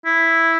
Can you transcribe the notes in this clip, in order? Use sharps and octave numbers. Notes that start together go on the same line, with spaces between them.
E4